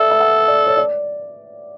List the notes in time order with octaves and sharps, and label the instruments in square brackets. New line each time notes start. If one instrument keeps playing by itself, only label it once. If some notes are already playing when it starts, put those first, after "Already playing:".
Already playing: [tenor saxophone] A4 [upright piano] D5 E5
[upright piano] E5
F#5
D5
C#5
D5